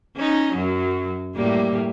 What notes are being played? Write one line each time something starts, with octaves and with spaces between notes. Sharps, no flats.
C#4 D#4
F#2 F#3
A2 G3 A#3